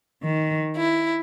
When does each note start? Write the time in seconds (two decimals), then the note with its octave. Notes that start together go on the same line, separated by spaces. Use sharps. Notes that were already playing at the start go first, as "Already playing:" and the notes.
0.23 D#3
0.76 E4